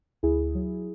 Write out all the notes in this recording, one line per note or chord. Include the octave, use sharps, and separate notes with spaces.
D2 E4 G#4
F#3